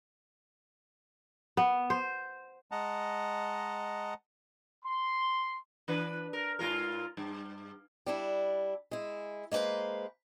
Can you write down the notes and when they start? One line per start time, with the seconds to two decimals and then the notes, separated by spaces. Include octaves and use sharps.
1.57 B3
1.90 C5
2.71 G#3 D#5 F#5 A5 A#5
4.85 C6
5.88 E3 D4 B4
6.33 A#4
6.59 G#2 F4 A#4
7.17 G2
8.06 G3 D4 E4
8.91 G#3 E4
9.52 G#3 A#3 C#4 B4 C5